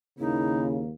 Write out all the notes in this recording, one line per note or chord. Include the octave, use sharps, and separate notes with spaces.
D#2 G#2 C#3 A#3 D#4 E4